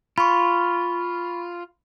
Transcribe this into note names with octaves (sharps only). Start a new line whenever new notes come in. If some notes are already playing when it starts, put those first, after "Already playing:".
F4 B5 C#6